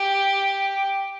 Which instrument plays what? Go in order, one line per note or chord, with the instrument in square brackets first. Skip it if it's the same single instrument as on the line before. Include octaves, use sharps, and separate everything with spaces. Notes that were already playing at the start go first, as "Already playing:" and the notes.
Already playing: [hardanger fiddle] G4